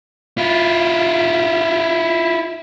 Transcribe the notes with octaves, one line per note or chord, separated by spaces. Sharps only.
E4 F4